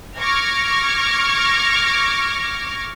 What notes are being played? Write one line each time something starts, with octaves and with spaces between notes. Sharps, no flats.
C#6 D6 F6 G#6 A#6